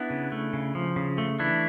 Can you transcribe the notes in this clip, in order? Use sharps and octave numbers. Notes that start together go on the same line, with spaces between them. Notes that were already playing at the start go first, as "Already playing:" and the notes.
Already playing: B3 D4 E4
C#3
A3
C#3
F3
C#3
A3
E3 D4 E4